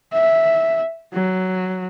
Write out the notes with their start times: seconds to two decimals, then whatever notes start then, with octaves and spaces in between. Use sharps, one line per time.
0.13 E5
1.13 F#3